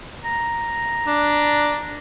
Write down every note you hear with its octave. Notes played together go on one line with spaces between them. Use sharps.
A#5
D4